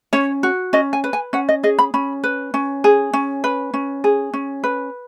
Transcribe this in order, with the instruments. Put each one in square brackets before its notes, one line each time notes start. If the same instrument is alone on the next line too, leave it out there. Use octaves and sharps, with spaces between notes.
[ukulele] C#4 C#5
F#4
C#4 D#5
G#5
B4
G#5
C#4 F#5
D#5
G#4 D#5
B5
C#4 B5
B4
C#4
G#4
C#4
B4
C#4
G#4
C#4
B4